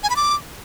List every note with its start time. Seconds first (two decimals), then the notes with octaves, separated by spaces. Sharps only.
0.03 G#5
0.10 B5
0.16 D6